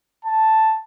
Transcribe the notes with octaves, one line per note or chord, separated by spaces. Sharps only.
A5